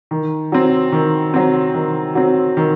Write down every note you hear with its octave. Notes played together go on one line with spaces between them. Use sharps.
D#3
F#3 C4
D#3
F#3 C4
D#3
F#3 C4
D#3